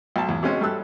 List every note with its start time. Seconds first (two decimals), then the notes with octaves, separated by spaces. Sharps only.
0.16 B1 A5
0.29 E2
0.43 B2 G#3 C4 C#4 F#4
0.61 G3 A3 A4 E6 F#6